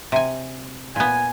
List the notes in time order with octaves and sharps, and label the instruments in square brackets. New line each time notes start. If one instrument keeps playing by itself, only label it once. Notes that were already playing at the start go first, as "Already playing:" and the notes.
[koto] C3 G#5
[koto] A#2 B3 [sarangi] G#5